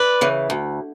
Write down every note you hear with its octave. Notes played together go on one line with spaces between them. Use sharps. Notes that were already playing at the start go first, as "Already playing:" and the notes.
Already playing: B4 D5
C#3 E3
D2